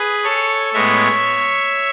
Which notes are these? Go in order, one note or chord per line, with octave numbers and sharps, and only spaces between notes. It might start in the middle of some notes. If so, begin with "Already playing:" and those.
Already playing: G#4 B4
A4 C#5
A2 G#3 B3 C#5 E5